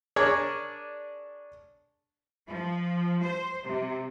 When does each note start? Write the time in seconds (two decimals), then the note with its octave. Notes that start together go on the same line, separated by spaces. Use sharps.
0.16 D4 G#4 A#4 C#5 D5 G#5
2.46 F3
3.22 C5
3.65 C3